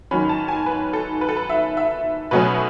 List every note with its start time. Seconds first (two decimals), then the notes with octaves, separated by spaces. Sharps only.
0.11 G#2 D#3 F#3 C#4 B5
0.29 A5
0.48 G#5
0.66 B4
0.93 A4
1.21 B4
1.29 A4
1.36 B4
1.50 E5
1.77 E5
2.31 B2 F#3 A3 C#4 B4